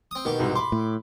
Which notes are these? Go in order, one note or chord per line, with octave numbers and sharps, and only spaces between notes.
C4 D#6
B2 D#3 G4
C2 G#2 F#4
B5 C6 D6
A2